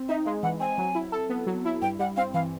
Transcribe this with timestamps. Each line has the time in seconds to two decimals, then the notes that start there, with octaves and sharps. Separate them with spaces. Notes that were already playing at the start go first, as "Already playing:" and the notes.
Already playing: C4
0.09 D#4 E5
0.25 G#3 F5
0.43 E3 F#5
0.60 C4 G#5
0.78 F#3
0.95 E4
1.12 A4
1.30 B3
1.47 F#3
1.65 E4
1.82 G2 G5
1.99 G3 F#5
2.17 C4 F5
2.34 E3 F5